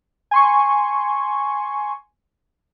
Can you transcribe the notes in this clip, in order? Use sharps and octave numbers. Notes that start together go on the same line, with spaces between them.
G#5 C6 C#6